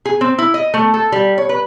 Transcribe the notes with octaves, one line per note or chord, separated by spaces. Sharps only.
G#4
C4
E4
D#5
A3
A4
G3
C#5
B4